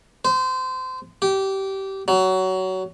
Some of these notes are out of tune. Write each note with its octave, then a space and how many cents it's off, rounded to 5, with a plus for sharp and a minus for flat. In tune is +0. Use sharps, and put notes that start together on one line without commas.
C5 -25
G4 -20
F#3 +20